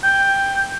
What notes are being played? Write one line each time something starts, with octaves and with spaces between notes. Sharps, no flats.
G5